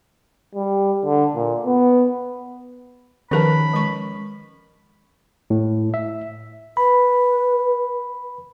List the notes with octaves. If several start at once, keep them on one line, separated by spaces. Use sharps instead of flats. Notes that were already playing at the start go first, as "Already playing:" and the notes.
G3
D3
A#2
B3
D#3 F3 C#4 A#4 B4 A5 B5
G#3 C#6
A2
E5
B4 B5